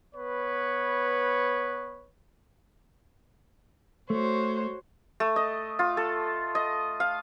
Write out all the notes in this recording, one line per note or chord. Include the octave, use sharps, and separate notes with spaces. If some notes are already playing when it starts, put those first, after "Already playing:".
B3 B4 C#5
A3 F#4 C5 C#5
A3
D#5
F4
A4
D#5
F5